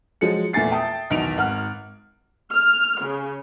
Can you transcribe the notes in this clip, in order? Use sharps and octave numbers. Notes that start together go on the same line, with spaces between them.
F3 F#3 G#3 C#7
E2 A#2 A3 G#5 A6 C7
E5 G5 A5 D#6
B1 E2 D#3 D7 F7
G#1 F#5 F6
F6
C#3